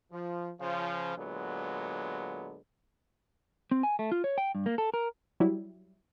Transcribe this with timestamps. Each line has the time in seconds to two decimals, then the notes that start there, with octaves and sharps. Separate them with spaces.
0.12 F3
0.60 C#3 F3
1.17 A#2 D3 F#3 G#3 B3
3.71 C4
3.83 G#5
3.99 A3
4.12 F4
4.24 C#5
4.38 G5
4.55 G2
4.66 A#3
4.78 A4
4.94 A#4
5.40 F#3 G3 E4